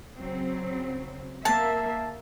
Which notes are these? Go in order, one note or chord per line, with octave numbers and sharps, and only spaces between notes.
C#3 F#3 C4
A#3 E5 A5